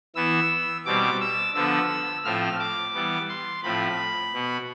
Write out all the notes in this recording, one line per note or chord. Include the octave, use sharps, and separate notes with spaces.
E3 B3 E6
B2 G3 C4 D6
E6
D3 F3 B3 E6
A2 F3 C4 F6
D6
E3 G3 B3
C6
A2 F3 C4 B5
B2 B3